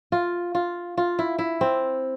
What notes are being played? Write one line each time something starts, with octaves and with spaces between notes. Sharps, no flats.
F4
F4
F4
E4
E4
C4